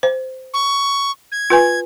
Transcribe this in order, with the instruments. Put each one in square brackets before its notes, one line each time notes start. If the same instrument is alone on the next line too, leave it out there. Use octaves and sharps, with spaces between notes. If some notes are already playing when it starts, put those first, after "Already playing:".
[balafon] C5
[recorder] C#6
G#6
[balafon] F4 B4 G#5